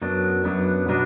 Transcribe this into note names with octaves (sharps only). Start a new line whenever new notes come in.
F#2 F#3 B3 D4
F#2 F#3 B3 D4
B2 F#3 B3 D4 F#4